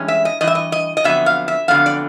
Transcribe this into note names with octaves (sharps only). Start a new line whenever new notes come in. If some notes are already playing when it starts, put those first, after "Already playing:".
Already playing: G2 E3 G#3 C#4
E5
D#5
G2 E3 D#5
E5
D#5
D#5
D#5
F2 D3 F#3 B3 E5
F5
E5
F2 D3 F#3 B3 F5
D5